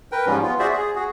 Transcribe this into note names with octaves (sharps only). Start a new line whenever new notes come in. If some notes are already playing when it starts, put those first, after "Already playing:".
A#4 B4 G5
G#2 F3 G3 C#4
B3 F4
F#4 G#4 C5 D5 E5
G#4
F#4 G#4